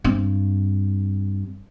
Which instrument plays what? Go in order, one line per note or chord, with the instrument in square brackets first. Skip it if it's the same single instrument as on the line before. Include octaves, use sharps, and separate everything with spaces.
[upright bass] G2 C4